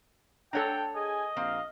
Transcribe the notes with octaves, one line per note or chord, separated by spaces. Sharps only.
D4 A4 C#5 F#5 G5 A5 A#5
G#4 D#5 G#5
A#1 A#3 C4 F5